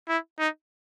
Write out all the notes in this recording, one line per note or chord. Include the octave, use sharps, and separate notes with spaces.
E4
D#4